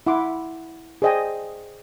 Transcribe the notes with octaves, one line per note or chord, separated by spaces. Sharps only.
E4 F#5 C6 D6
G#4 C5 D5 D#5 G5 G#5